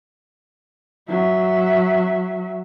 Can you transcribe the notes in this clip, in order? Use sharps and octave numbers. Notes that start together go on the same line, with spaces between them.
F#3 E5